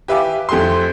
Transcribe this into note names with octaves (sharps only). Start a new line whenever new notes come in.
G4 B4 E5 F5 G#5 D6
F2 A3 G4 G#5 C6